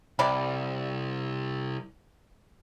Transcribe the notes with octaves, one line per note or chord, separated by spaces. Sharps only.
C2 C3 D5 B5